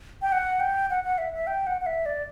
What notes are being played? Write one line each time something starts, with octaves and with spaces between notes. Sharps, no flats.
G5
F#5
G5
F#5
F#5
E5
E5
G5
F#5
F#5
E5
D5